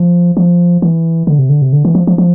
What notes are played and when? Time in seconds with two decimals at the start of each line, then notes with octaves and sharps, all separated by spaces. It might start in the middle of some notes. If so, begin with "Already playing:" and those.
Already playing: F3
0.37 F3
0.82 E3
1.27 D3
1.39 C3
1.49 D3
1.62 C3
1.73 D3
1.85 E3
1.95 F3
2.07 F3
2.18 F3